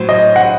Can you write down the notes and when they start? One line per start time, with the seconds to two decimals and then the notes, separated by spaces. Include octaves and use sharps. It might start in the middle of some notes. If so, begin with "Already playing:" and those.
Already playing: A2 F#3 C5
0.09 D#5
0.36 F#5